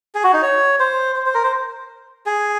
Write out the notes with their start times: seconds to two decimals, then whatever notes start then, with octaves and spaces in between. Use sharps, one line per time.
0.15 G#4
0.24 F#4
0.33 D#4
0.42 C#5
0.80 C5
1.16 C5
1.26 C5
1.34 A#4
1.44 C5
2.26 G#4